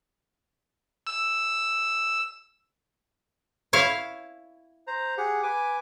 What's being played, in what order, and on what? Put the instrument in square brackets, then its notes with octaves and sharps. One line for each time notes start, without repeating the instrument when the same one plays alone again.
[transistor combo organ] E6
[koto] E4 C#5 F5
[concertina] C5 A#5
G4 G#4 F#5
B4 G#5 D6